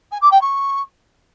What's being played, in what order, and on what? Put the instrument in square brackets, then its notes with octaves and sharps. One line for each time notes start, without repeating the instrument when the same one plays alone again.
[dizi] G#5
D6
G5
C#6